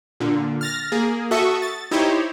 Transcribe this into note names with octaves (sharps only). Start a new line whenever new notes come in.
A#2 D3
F6 A6 A#6
A#3 G#4
F#4 A4 E5 C#6 D#6
A6
D#4 E4 G4 C5 C#5